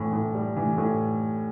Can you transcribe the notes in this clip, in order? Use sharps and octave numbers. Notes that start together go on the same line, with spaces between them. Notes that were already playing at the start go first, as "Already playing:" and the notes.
Already playing: A2 E3
A2
G3
E3
A2